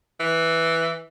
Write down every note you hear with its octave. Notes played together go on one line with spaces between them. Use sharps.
E3